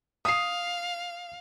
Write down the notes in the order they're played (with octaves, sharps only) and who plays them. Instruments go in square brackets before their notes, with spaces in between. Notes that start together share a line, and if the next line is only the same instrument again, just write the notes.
[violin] F5 [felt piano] D#6 C7